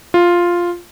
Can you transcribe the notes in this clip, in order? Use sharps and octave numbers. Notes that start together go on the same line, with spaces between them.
F4